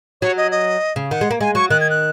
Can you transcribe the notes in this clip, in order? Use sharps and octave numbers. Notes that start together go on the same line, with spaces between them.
F#3 C#5
D#5
D#5
C#3
D#3 F#5
G#3
A#3
G#3 G#5
F#3 C#6
D#3 F#6
G#6
F#6